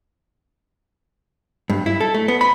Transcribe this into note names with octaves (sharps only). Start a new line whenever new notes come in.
G2
E4
A4
A3
B3
B5